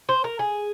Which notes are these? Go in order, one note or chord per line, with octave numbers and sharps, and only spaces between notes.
C5
A#4
G#4